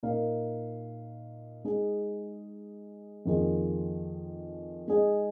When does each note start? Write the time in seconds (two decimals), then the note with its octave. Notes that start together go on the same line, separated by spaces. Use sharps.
0.03 A#2 A#3 D#4 A#4 F5
1.64 G#3 D#4 G#4
3.25 F2 D#3 A#3 F4 G#4
4.88 G#3 D#4 G#4 D#5